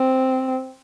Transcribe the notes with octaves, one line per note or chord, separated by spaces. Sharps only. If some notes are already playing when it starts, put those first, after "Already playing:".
Already playing: C4